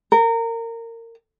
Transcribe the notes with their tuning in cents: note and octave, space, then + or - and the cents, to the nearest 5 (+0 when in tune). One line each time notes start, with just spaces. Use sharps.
A#4 -25